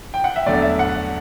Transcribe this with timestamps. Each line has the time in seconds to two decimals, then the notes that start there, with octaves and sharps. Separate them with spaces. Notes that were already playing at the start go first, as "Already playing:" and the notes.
0.14 G5
0.24 F#5
0.36 E5
0.46 E2 D3 F#3 A3 D5
0.62 E5
0.79 F#5